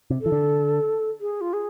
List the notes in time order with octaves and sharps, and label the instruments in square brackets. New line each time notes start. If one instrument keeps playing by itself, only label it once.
[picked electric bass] C3
[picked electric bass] E3 [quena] A4
[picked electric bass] D3
[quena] G#4
F4
G#4